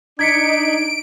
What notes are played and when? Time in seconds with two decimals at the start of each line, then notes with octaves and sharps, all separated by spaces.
0.19 D4 D#4 G#6 B6 C#7 D7